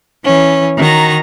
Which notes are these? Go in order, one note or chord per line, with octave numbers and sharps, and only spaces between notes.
E3 C#4
D#3 F#4 A#5